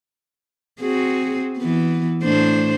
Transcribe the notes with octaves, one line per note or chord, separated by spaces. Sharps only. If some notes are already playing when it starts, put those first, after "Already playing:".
C4 F#4 G#4
E3 B3
A2 D4 C5